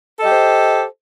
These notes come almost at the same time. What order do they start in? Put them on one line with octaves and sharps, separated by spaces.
A4 D#5 G4 C5